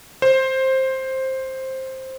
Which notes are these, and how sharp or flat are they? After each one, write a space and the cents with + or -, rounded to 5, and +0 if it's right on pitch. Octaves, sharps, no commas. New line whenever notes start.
C5 +10